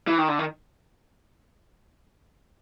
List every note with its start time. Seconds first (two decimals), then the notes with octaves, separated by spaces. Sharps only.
0.07 E3
0.18 D#3
0.28 D3
0.39 D#3